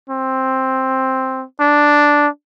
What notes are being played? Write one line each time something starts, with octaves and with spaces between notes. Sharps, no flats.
C4
D4